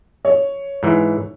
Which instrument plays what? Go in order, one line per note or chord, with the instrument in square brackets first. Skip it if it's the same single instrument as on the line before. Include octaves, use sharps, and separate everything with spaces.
[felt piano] C#5
[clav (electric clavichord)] G#2 E3